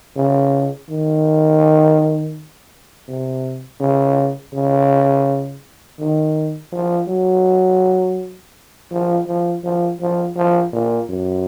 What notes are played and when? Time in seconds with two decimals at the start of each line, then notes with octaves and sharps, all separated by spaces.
0.16 C#3
0.89 D#3
3.08 C3
3.80 C#3
4.53 C#3
5.99 D#3
6.72 F3
7.08 F#3
8.91 F3
9.27 F3
9.64 F3
10.00 F3
10.36 F3
10.73 A#2
11.09 F#2